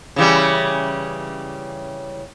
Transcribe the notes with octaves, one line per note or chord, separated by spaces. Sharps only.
C#3 E3 G3